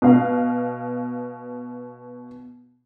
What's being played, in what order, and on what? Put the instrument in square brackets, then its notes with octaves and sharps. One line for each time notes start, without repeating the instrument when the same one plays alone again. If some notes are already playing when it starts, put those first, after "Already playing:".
[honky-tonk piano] B2 F5